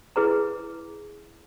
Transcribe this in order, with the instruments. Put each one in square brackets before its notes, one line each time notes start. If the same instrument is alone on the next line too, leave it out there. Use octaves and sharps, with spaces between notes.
[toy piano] E4 G#4 B4 A#5